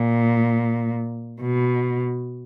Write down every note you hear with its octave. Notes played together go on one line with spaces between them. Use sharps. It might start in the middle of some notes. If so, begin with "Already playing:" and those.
Already playing: A#2
B2